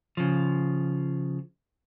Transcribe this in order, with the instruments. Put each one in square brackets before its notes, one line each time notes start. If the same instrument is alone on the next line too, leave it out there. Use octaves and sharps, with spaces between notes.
[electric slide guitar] C#3 F3